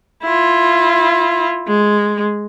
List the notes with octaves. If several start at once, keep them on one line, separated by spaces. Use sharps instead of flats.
E4 F4
G#3